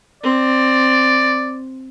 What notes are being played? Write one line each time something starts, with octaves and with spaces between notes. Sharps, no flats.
C4 D5